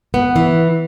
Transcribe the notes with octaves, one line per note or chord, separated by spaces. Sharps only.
B3
E3